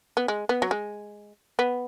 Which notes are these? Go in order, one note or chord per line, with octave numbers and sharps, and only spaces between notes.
B3
G#3
B3
F#3
G#3
B3